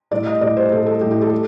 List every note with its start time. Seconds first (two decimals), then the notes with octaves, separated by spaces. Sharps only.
0.11 A2 G3 D5
0.26 D#5
0.41 A2 G3 D5
0.57 C5
0.72 A2 G3 A4
0.86 A4
1.01 A2 G3 G4
1.11 G4
1.22 A4
1.31 G3